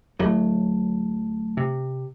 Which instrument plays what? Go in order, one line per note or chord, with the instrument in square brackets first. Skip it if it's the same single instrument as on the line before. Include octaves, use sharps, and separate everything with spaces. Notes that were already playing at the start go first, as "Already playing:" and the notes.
[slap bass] D1 F#3 [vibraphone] A3
[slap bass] C3